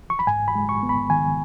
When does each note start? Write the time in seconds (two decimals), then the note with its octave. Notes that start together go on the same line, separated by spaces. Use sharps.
0.10 C#6
0.19 B5
0.27 G#2 G#5
0.48 B5
0.55 G#3
0.69 C#6
0.83 B3
0.89 B5
1.10 D#3 G#5